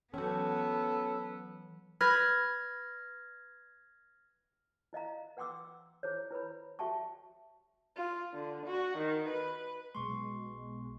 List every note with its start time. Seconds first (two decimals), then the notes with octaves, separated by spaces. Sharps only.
0.14 E3 F#3 B3 C#4 F#4 A4
2.01 B4 F6 G#6 A#6
4.93 E4 D#5 F5 A#5
5.37 B4 F#5 G5 C6 D6 E6
6.03 E4 G#4 C5 C#5
6.31 E4 B4 C#5 B5
6.79 F#4 G4 E5 G5 A5 C#6
7.97 F4
8.34 D3
8.66 F#4
8.98 D#3
9.29 B4
9.95 B1 B2 G#3 C6 C#6